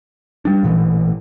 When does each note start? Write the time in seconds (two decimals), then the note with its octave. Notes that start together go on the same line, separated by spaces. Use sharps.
0.45 G3 D4
0.63 A1 A#2 E3